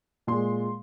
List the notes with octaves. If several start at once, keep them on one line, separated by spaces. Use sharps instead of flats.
A#2 G#3 C6